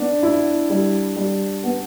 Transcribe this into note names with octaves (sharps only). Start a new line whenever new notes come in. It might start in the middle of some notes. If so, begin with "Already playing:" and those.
Already playing: B3 D4
E4
G3
G3
B3